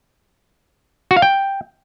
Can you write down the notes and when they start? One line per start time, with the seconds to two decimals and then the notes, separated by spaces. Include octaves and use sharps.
1.11 F#4
1.17 F5
1.22 G5